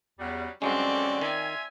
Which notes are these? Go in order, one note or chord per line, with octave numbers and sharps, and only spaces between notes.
E2 C#3 F#3 G3
G2 D3 F#3 G#3 C4 C#4 D5
D#3 F4 E5 G#5